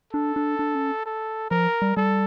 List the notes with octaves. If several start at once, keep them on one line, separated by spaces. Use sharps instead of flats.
D4 A4
D4
D4
C#4
A4
F3 A#4
G3
G3 A4